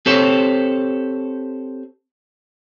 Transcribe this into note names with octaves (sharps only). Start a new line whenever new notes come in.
C4 G4 A4 C5 C#5